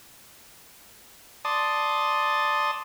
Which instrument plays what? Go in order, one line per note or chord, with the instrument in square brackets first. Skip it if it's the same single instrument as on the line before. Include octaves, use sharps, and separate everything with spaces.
[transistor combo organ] D5 A5 C6 D#6